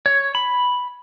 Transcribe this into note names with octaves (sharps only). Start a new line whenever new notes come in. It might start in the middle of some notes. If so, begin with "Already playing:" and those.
C#5
B5